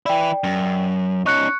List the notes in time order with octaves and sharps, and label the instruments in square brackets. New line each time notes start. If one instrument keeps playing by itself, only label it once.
[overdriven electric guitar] E3 E4 [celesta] D5 G5
[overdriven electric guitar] F#2
[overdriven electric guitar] C#4 D#4 [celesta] C#6 F#6 C#7